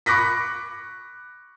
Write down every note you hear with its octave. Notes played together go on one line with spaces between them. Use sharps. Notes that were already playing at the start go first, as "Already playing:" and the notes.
B5 C#6 D6 F#6 A#6 B6